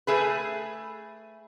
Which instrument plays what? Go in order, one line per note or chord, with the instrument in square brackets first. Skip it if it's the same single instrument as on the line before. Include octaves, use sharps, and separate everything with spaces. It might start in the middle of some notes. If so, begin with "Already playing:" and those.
[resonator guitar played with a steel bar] A3 G#4 B4